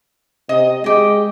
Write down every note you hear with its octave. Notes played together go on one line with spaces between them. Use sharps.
C3 D#5
G#3 G4 D#5